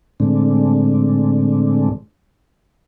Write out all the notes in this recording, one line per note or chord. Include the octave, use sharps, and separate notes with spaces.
A2 D3 G#3 A3 C4 D4